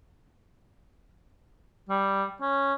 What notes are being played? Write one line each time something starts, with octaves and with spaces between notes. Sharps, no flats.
G3
C#4